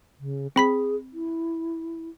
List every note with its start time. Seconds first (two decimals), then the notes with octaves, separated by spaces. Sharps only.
0.20 C#3
0.56 C4 G#4 B5 B6
1.13 E4